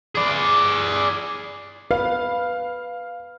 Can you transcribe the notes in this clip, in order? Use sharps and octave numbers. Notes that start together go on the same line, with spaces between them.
G#4 D5
B4 F5